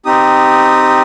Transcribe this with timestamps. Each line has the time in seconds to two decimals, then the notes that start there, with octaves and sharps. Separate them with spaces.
0.05 C4 D#4 G4 D#6